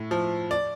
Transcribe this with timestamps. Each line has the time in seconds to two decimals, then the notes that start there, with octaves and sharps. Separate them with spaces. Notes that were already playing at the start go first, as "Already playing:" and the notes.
Already playing: A2
0.11 F3
0.51 D5